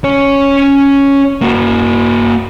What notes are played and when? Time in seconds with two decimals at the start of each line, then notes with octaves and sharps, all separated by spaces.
0.04 C#4 C#5
1.41 A#3 F#4